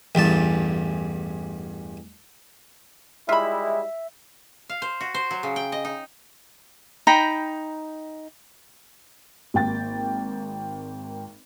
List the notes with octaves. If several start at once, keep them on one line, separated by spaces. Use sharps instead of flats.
A1 E2 G2 A5
G3 G#3 E4 F4 E5 B5
F5
C5
F#4
C5
F#3
C#3
G5
D#5
D#4
D#4 G5 A#5 B5
G#1 A#3 G5 A6